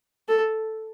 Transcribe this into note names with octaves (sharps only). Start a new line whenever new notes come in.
A4